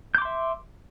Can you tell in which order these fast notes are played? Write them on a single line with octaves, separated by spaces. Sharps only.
G6 D6 C6 E5